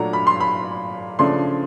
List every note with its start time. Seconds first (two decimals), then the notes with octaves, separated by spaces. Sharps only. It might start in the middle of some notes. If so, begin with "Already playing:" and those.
Already playing: A#2 F#3 A3 D4 A#5
0.13 B5
0.27 C6
0.40 B5
1.19 C#3 F3 A3 D4 C6